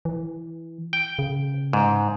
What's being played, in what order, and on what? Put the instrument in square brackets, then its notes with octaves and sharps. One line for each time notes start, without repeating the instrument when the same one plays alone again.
[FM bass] E3
[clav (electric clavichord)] G5
[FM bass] C#3
[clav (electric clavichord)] G#2